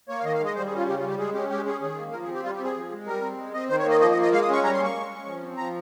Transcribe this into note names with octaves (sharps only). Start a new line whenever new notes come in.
A#3 C#5
F5
D#3 D#5
F5
G#3
D#5
G3 C5
G#4
C#4 F4
C#3 G4
F4
G3 G4
G#3 G#4
C#4 G4
G#3 G4
C#4 G#4
D#3 G#4
A#3
F3 A#4
G#4
C4
G4
G3 F4
G4
C4
G#4
F3
G#3
G3 A#4
C4
G#3
C4 D#5
D#3 C5
C#5
A#3 D#5
F3 D#5
D#5
A#3
D#5
G#3 F5
D#6
C#4 C#6
G3 A#5
C6
A#3
C#6
G#3
C#4
F3
C4
F3 A#5